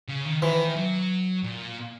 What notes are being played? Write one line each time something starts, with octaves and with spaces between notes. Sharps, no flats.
C#3
D#3
D#3 E3
F#3
A#2